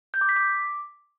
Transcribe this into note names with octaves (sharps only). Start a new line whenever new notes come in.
G6
D6
B6
D6